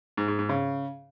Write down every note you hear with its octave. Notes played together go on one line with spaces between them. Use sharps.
G#2
G#2
G#2
C#3